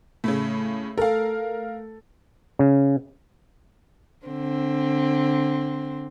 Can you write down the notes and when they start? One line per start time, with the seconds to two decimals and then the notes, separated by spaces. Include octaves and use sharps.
0.24 A2 C#3 A3
0.98 A4 A#4 F5
2.59 C#3
4.26 D3 C4